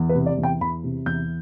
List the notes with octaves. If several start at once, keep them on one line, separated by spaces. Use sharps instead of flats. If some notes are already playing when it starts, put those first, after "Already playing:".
Already playing: E2
B4
C3
D5
E2
G5
E2 B5
C3
E2 G6